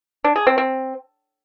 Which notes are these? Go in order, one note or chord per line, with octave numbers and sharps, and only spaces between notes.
D4
G#4
C4
C4